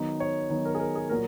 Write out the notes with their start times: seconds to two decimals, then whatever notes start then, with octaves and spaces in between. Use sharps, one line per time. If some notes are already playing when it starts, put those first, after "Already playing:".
Already playing: D#3 F#3 B3 D#4
0.20 C#5
0.50 D#3 F#3 B3 D#4
0.65 A#4
0.75 G#4
0.80 A#4
0.96 G#4
1.10 A#2 F#3 A#3 A#4